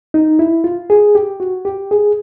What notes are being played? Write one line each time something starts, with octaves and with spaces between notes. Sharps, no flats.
D#4
E4
F4
G#4
G4
F#4
G4
G#4